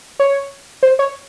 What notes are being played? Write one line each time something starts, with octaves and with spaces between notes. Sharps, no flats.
C#5
C5
C#5